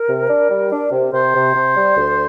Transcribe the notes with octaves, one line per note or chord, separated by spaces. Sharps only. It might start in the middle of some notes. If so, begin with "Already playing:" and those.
Already playing: A#4
C3
D4
G3
D4
C3
C3 C5
C3
C3
G3
D2